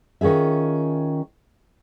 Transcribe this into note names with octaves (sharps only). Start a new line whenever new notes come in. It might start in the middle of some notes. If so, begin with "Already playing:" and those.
D#3 C#4 F4 G#4 E5